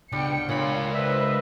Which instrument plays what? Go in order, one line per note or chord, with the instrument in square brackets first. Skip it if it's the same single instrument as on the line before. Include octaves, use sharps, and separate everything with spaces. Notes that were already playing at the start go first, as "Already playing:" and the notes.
[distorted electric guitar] C#2 [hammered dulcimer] G3 D4 [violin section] B3 G5 C#7
[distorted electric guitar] C#2 B5 [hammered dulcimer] A#2 D4 [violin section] F4 [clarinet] C#5
[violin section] B4 C5 D#5 [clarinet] E5